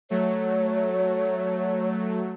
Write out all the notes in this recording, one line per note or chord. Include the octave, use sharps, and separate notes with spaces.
F#3 A3 C#5